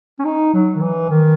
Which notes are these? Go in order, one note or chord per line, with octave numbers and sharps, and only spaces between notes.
C#4
D#4
F#3
D#3
E3
D#3